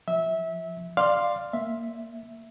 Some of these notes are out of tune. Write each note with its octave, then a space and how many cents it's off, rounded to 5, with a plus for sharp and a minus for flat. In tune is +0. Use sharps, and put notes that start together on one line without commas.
F3 +0 E5 -20
D5 +15 F5 +0 C6 +0
A#3 +0 E5 +0